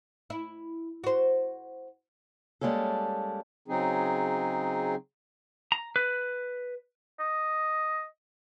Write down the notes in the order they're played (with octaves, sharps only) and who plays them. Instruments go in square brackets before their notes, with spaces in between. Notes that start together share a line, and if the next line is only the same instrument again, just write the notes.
[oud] E4
F#4 C5
[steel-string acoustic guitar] G3 G#3 A#3 C#4 A4
[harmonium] C#3 F#3 C4 D#4 G#4
[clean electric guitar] A#5
B4
[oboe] D#5